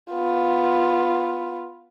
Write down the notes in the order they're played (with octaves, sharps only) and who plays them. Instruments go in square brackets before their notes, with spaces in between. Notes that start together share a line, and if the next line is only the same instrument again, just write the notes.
[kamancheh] B3 F4